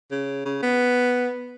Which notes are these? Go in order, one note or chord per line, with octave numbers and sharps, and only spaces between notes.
C#3
C#3
B3